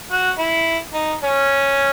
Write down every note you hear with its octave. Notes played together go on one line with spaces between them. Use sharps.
F#4
E4
D#4
C#4